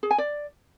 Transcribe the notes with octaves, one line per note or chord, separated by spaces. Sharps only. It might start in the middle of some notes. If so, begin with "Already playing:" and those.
G#4
G#5
D5